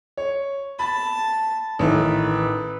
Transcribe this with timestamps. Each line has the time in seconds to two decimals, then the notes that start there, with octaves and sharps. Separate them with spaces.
0.17 C#5
0.79 A5 B5
1.79 A1 D#3 A4 B4